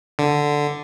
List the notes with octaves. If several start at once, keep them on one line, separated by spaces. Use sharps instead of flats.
D3